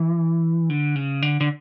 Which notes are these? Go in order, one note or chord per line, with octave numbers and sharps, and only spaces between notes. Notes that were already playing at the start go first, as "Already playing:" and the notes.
Already playing: E3
D3
C#3
D3
D3